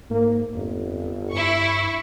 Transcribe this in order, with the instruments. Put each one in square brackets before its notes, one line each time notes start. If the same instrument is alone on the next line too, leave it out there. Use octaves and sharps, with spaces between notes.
[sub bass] G#2 [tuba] A#3
[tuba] G1 [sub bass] F2
[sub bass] G2 [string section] E4 C#6